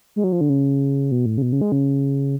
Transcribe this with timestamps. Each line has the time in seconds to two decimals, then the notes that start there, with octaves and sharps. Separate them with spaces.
0.16 G#3
0.24 F#3
0.32 F3
0.41 D3
0.49 C#3
1.11 B2
1.26 A2
1.38 C#3
1.42 B2
1.52 C#3
1.61 G#3
1.72 C#3